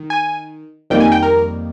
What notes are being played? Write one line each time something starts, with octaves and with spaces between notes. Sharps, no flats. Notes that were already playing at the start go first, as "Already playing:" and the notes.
Already playing: D#3
G#5
F2 D#3 G3 A#3 G5
G#5
G5
A#4